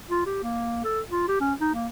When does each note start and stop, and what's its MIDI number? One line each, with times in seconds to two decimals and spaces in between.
0.10 0.23 65
0.26 0.39 67
0.43 0.84 58
0.84 1.01 69
1.11 1.25 65
1.28 1.36 67
1.41 1.53 61
1.61 1.70 63
1.74 1.87 58